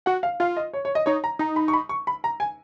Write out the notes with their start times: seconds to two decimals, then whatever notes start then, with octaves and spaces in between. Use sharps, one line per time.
0.06 F#4 F#5
0.23 F5
0.40 F4 F5
0.57 D#5
0.73 C#5
0.85 C#5
0.95 D#5
1.06 D#4 C#5
1.24 A#5
1.39 D#4 A#5
1.56 B5
1.68 C#6
1.73 B5
1.89 C#6
2.07 B5
2.24 A#5
2.40 G#5